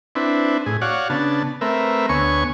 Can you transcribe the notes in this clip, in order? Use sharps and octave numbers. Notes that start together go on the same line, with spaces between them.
C4 D4 E4 B4
A2 G#4
F#4 C#5 D5 F5 F#5
C#3 B3 D4 A5
A3 C4 A#4 B4 E5
D2 B3 C#5 G#5 C#6